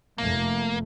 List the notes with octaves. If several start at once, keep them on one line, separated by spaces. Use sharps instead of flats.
F1 A3 A#3